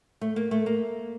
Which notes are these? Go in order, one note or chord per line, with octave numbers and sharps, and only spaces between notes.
A3
A#3
A3
A#3